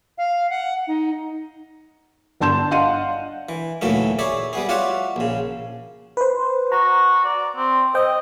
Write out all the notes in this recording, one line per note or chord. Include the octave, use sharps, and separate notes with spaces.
F5
F#5
D#4
G1 D4 A5 C6 G6 E7
D4 D#5 F5 F#5 C6 D#7
E3
D2 A#2 E3 F#3 A3 D#4
G#4 C#5 D5 E5 B5
G3 B3 G#4
F4 F#4 C#5 D5 E5 F#5
A#1 C#3
B4 C5
F#4 A#5
D5
C4
C5 D#5 G5